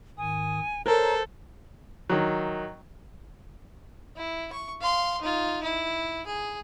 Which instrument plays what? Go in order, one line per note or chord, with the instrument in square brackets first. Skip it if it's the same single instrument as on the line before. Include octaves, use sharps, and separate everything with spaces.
[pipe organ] G#2 D#3 D#6 [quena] G#5
[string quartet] A4 [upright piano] A#4 [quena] C5 [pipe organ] C#5 A#5
[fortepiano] D#3 F#3
[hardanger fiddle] E4
C#6
F5 C6
D#4 F4
E4
G#4